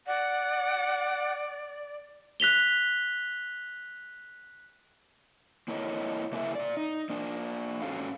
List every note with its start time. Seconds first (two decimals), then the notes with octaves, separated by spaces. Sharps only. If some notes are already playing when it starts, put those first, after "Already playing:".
0.07 D5 F#5
2.40 F#6 B6 F7 G7
5.68 A#3 E4 A4 A#4 C#5 D#5
6.32 C#3 A#3 E4 G#4 A#4 E5
6.55 A#2 D5
6.77 D#4
7.10 A#3 D4
7.82 G#2 C#4 F#4 A4 F5